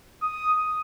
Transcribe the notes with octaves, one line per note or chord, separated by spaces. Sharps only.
D#6